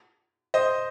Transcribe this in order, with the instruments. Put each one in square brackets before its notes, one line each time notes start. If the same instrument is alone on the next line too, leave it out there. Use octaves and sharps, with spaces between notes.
[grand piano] C5 D#5